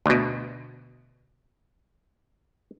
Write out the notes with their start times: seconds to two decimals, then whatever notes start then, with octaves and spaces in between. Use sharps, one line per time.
0.06 D2 B2